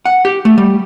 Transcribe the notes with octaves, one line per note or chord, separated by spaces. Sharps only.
F#5
G4
A3
G3